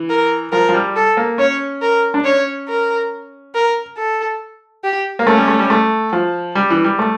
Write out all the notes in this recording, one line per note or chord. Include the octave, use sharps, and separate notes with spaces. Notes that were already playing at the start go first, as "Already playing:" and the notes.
Already playing: E3
A#4
F3 A#4
F3
G3
A4
A#3
C#4 C#5
A#4
D4
C#4 C#5
A#4
A#4
A4
G4
A#3
A3 C#4
G3
A3
G3
A3
F3
G3
E3
G3
A3